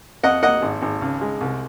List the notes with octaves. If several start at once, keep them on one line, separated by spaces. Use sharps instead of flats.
F2 D#5 F#5
A#3 D#5 F#5
G#1
G#1
C#2
G#3
C2